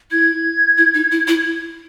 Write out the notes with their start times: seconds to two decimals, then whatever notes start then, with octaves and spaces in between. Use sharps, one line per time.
0.11 E4 G#6
0.78 E4
0.94 D#4
1.12 E4
1.28 E4